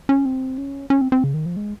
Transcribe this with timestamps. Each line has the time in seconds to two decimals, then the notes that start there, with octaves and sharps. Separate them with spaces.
0.09 C#4
0.26 C4
0.58 C#4
0.90 C#4
1.01 C4
1.12 C4
1.24 C#3
1.34 D#3
1.46 F3
1.57 G#3